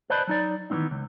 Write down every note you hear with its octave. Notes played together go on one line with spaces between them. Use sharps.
B4 C5 D5 D#5 A5 B5
F#3 D#4 D5
D#3 E3 G#3 B3 C4 D#4
C#2